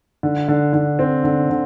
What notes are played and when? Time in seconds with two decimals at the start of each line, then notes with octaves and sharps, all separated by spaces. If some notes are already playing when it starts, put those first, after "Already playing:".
0.23 D3
0.48 D3
0.73 D3
0.99 C4
1.24 D3
1.50 D3